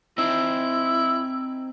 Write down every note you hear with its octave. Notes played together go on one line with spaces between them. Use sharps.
C4 D#4 E4